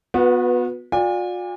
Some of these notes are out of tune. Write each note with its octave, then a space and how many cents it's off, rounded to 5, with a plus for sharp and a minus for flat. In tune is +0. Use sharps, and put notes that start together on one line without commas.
B3 +0 F#4 -40 B4 -15
F4 +45 D5 +0 G#5 -40